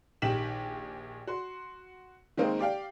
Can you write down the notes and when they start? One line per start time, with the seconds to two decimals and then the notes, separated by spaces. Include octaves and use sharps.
0.22 A#1 D#3 G4 B6 E7 F#7
1.27 F#4 C6
2.37 D#3 G#3 A#3 C4 D#4
2.59 G4 D5 F5 G5